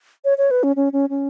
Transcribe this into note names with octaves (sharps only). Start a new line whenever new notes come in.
C#5
C#5
B4
C#4
C#4
C#4
C#4